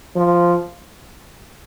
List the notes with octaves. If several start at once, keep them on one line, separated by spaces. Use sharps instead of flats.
F3